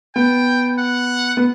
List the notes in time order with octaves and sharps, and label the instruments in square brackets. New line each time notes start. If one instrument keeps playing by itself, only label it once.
[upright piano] B3 [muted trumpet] G5
[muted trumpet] F#5
[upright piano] B3